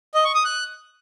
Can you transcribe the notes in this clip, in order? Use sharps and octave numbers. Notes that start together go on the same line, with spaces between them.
D#5
C#6
D#6
F#6